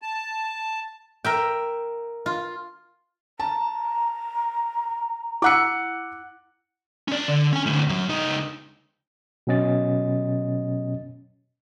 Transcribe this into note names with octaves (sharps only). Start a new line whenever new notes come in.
A5
A#4 E5 G5
F4
A5 A#5
E4 F#5 D6 E6 F#6 C#7
C#4 D5
D3
C#4 G#5
A2 D3
F#2 F#3
C#2 D#4
B2 F#3 C#4 D#5 A6